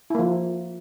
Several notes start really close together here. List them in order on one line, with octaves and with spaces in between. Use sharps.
E4 A#3 F3